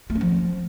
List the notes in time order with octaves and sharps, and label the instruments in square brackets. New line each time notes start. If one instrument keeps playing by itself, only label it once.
[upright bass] A3
C#4
F3